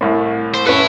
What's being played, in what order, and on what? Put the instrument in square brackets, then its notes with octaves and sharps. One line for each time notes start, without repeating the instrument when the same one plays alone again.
[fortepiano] C2 A2
[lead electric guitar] C5
[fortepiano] C#4 B4 [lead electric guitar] E4 A4